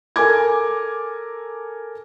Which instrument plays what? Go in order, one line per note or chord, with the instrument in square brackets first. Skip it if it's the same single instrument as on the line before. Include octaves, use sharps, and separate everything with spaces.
[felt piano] A4 A#4 G#5 D6 G#6